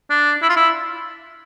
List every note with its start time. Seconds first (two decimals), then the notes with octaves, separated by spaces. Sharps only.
0.10 D4
0.42 E4
0.49 F4
0.56 E4